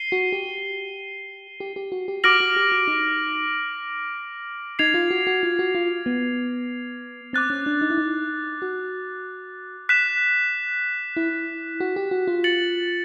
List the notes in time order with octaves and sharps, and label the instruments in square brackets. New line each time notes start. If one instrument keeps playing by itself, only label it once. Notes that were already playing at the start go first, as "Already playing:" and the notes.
Already playing: [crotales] C7 D#7 G7
[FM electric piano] F#4
G4
G4
G4
F#4
G4
[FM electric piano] F#4 [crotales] D6 F6 A#6 D7 F#7
[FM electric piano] F#4
G4
F#4
D#4
[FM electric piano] D#4 [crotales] G#6 C7 F7
[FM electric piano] F4
F#4
F#4
F4
F#4
F4
B3
[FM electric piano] C4 [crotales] D6 F#6 A6
[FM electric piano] C#4
D4
D#4
E4
D#4
F#4
[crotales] F#6 B6 E7
[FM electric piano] E4
F#4
G4
F#4
F4
[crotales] A6 C#7 F#7